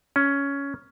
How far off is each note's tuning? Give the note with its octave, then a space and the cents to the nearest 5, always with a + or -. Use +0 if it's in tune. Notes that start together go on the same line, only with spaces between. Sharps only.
C#4 +10